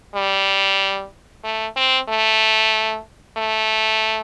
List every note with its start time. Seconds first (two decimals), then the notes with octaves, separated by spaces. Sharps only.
0.15 G3
1.44 A3
1.76 C4
2.09 A3
3.37 A3